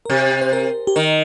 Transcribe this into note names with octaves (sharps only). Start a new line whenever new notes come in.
A#4
C3 G4
C5
A#4
G4
D#3 A#4